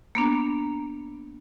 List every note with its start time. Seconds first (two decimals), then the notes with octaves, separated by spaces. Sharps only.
0.15 A#3 B3 D4 A#5